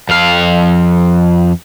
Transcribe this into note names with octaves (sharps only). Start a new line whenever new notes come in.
F2 F5